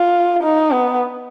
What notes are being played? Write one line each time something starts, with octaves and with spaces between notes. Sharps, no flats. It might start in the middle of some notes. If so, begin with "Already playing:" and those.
Already playing: F4
D#4
B3